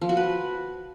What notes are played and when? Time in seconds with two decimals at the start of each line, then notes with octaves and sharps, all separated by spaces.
0.01 F3
0.09 F#4
0.17 B4